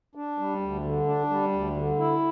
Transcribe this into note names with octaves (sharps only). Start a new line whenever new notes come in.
D4
G3
D2
D3
D4
G3
D2
D3
E4